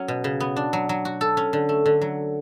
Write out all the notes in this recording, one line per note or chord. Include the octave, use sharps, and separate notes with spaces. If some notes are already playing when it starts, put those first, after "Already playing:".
Already playing: F#3 C#4
B2
C#3
B3
D4
F#3
F#3
F#4
A4
C#4
D3
A3
D3
F#3